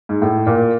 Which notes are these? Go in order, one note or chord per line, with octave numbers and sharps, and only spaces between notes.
G#2
A2
A#2